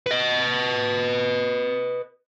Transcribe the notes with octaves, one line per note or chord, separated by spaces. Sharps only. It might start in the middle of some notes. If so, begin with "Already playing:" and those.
B4 D#5